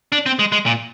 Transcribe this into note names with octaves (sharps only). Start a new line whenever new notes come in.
D4
C4
G#3
G#3
A#2